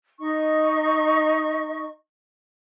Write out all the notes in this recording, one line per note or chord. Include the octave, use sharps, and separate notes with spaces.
D#4 D#5 C#6